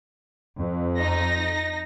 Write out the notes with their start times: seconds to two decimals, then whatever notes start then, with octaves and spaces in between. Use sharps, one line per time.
0.58 F2
0.97 D#4 A#6